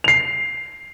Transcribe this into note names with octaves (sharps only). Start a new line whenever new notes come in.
C7 F7